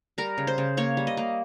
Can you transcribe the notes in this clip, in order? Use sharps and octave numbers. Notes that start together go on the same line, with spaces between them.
G3 A#4
C#3
C5
C#3
A#3 C#5
G3
D#5
A#3